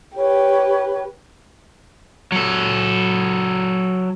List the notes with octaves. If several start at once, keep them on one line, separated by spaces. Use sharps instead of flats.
G4 B4 C#5
F#3 A4